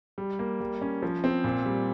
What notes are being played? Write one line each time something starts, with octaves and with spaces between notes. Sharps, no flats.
G3
A#3
G3
C#4
F3
C4
A#2
G3